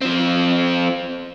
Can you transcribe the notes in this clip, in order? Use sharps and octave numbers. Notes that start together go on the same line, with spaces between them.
F3 C4